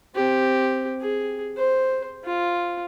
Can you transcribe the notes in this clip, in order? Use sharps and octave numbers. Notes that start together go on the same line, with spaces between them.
C4 G4
G#4
C5
F4